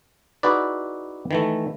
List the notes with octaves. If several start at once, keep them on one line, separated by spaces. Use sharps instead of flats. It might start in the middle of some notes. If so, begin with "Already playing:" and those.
D#4 E4 F#4 G#4 B4 D5
D#3 E3 A3